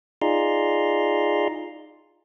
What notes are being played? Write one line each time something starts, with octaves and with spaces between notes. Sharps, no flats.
D#4 F4 G#4 D5 A#5 C6